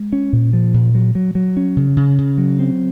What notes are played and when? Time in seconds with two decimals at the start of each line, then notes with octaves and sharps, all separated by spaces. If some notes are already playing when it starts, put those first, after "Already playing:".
Already playing: G#3
0.13 C#4
0.33 A#2
0.53 F3
0.74 A#2
0.95 F#3
1.15 F#3
1.35 F#3
1.57 C#4
1.77 C#3
1.97 C#3
2.18 C#3
2.38 F#3
2.59 C4